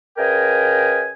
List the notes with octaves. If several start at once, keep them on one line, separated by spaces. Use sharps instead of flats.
C#3 A#4 B4 D#5 G5 G#5